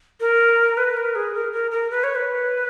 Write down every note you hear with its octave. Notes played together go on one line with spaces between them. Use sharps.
A#4
B4
A#4
G#4
A#4
A#4
A#4
B4
C#5
B4